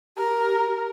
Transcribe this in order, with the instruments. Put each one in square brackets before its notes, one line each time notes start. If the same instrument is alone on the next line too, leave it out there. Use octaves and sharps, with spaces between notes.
[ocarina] G4 [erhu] A#4